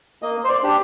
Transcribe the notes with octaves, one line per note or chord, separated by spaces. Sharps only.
A#3 D#5
C5
D5
D4 G4